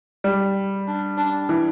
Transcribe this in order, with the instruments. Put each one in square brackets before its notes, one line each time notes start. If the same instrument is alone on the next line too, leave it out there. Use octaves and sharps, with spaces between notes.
[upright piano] G3
[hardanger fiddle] D4
D4
[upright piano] E3